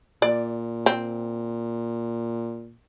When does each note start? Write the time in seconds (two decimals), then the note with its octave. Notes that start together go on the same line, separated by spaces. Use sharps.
0.22 A#2 D5
0.86 C4